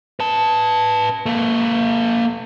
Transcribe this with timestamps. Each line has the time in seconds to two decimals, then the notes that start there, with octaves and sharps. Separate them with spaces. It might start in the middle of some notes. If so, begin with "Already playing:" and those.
0.20 B4 A5
1.26 A#3 A4